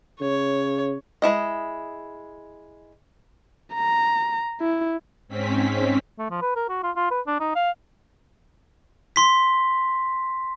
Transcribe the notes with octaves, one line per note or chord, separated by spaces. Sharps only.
C#3 C#5
G#3 C#4 E4 D#5
A#5
E4
G#2 C4 C#4 B6
A3
F3
B4
A#4
F#4
F4
F4
B4
D4
D#4
F5
C6 B6